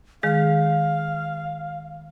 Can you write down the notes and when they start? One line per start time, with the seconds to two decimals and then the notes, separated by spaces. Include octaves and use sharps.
0.23 D#3 G#3 G#4 F5